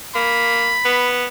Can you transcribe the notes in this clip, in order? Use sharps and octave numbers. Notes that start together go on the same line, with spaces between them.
A#3 B5
B3